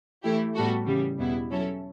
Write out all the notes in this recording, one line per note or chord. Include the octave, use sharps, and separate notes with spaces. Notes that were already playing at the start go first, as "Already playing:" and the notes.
E3 A3 E4 G4
A2 G3 B3 F#4 A4
C#3 E3 G3
E2 B2 G3 B3 E4
F#3 C#4 E4 A4